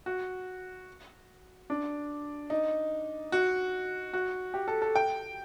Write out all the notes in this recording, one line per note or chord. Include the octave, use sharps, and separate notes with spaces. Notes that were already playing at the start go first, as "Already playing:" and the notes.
F#4
D4
D#4
F#4
F#4
G4
A4
A4
G5